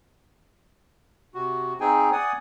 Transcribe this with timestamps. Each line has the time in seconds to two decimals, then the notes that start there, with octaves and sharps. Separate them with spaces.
1.35 C3 F#4
1.80 C4 D#4 G#4 G5 G#5
2.13 D5 F#5 G#5 D#6